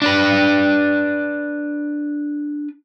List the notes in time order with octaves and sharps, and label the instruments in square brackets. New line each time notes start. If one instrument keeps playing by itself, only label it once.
[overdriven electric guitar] D4 B4